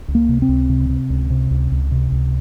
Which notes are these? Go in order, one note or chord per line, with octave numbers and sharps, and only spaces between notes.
C#2
A#3
C3
C4
C#2
C3
C3
C#2
C3
C#2
C#2
C3
C#2